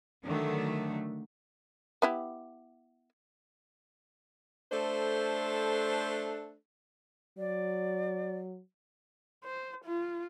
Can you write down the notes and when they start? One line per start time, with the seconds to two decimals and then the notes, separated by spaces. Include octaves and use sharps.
0.24 D3 D#3 F#3 A3
2.02 B3 E4 G4
4.72 A3 D4 A4 C5
7.38 F#3 D5
9.44 C5
9.85 F4